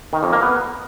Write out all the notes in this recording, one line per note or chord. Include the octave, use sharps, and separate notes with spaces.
D#3
F2
A#3
B3